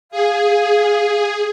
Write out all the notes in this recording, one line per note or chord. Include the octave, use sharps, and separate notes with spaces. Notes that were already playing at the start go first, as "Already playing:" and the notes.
G#4 F5